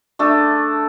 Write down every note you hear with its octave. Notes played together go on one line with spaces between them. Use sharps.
A3 D4 A4